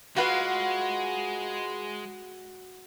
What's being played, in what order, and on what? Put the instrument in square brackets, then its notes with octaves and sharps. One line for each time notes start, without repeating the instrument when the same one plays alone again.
[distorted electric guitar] G#3 [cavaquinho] F4 B4 F5 [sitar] F#4